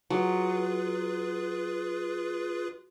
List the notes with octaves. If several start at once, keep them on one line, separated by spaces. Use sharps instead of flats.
F#3 F4 G#4 B4